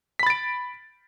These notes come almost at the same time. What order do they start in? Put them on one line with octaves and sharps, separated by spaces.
B6 B5 A6 D7